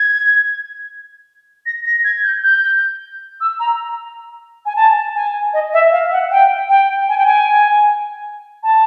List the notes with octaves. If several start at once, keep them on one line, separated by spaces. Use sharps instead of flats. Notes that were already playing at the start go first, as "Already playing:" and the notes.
Already playing: G#6
A#6
A#6
G#6
G6
G6
E6
A#5
G#5
A5
G#5
D#5
E5
F5
F#5
G5
G5
G#5
G5
G#5
A5